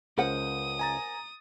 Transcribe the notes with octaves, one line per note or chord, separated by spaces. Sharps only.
C#2 A#4 C5 F#5 D#6
G#5 A#5 A6